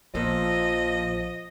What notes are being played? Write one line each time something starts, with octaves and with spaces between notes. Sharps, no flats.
A#1 A#2 F3 A4 D#5